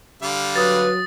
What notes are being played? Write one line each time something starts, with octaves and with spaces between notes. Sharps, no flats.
D3 G3 F5
F#3 B4 D#6 A6